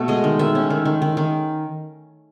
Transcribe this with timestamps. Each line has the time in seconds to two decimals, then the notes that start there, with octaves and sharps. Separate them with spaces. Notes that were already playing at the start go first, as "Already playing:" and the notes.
Already playing: B2 A3
0.08 G#3 D#5
0.24 D#3
0.39 D#3 E5
0.55 C#4
0.70 D#3
0.85 D#3
1.02 D#3
1.17 D#3